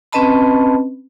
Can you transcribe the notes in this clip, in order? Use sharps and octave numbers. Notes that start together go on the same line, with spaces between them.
C4 C#4 B4 D#5 A5 B5